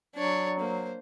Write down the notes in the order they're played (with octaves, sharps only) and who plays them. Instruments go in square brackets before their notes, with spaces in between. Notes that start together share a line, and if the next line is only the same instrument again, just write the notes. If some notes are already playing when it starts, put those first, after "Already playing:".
[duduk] F#3 [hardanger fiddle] D4 C#5
[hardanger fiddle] A#3 C5